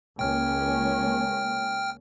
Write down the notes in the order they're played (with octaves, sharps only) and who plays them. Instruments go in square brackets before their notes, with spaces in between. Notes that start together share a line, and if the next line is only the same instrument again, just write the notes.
[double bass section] C#2 A#3 C#4 [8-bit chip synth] G5 F6